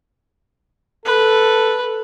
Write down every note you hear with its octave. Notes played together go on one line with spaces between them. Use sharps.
A4 B4